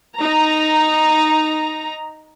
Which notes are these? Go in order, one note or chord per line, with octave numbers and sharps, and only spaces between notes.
D#4 A#5